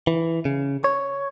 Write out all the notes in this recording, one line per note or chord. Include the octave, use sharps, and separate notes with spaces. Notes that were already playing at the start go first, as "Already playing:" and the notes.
E3
C#3
C#5